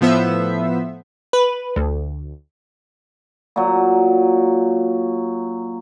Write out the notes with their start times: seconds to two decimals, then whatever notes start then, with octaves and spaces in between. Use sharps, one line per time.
0.01 A2 F3 B3 C5 E5 E6
1.33 B4
1.76 D2
3.56 A#2 F#3